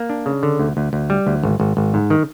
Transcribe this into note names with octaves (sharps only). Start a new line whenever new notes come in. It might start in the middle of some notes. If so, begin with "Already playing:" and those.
Already playing: A#3
D4
C#3
D3
D2
D2
D2
G3
D2
G#1
G#1
G#1
G#2
D#3